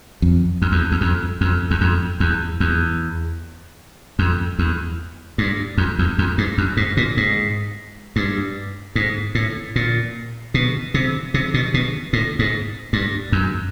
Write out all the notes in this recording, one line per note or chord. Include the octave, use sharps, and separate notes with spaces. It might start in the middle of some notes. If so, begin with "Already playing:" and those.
F2
F2
E2
E2
F2
F2
E2
F2
E2
E2
F2
E2
G2
F2
E2
F2
G2
F#2
G#2
A#2
G#2
G2
G#2
A2
A#2
B2
C3
C3
B2
B2
A2
G#2
G2
F#2